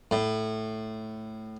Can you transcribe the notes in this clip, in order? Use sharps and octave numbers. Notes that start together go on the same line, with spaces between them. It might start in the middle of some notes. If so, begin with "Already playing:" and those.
A2